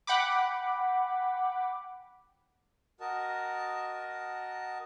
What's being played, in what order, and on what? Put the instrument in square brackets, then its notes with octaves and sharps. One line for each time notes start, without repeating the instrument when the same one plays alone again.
[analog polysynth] F#5 G5 B5 D6
[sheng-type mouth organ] F#4 A#4 D#5 A5